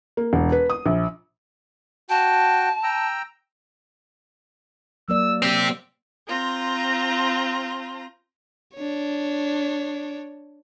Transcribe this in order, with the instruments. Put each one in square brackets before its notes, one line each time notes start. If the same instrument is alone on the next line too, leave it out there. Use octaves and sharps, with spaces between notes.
[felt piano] A#3
E1
B4
D#6
A#1
[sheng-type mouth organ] F#4 G5 [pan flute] A5
[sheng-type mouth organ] G5 A#5 E6
[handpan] F#3 A#3 D5 [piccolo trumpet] E6
[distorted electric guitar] C4 G4 [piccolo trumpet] E6
[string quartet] C4 F4 A#5
[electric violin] D4 C#5